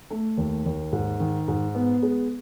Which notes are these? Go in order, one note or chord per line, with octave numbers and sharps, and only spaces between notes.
A3
D#2
D#2
G#2
D#3
G#2
B3
G#3